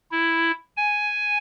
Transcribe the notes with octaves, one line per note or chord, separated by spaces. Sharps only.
E4
G#5